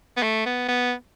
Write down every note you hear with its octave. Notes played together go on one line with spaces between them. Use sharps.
B3
A3
B3
B3